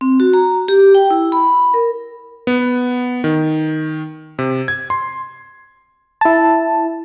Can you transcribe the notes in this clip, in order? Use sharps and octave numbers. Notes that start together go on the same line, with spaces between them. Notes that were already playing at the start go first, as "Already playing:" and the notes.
C4
F#4
A#5
G4
G5
E4
B5
A#4
B3
D#3
C3
G#6
C6
E4 A5